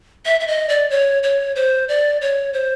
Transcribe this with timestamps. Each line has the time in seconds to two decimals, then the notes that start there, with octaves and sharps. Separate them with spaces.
0.25 E5
0.40 E5
0.48 D#5
0.69 D5
0.90 C#5
1.23 C#5
1.56 C5
1.89 D5
2.21 C#5
2.54 C5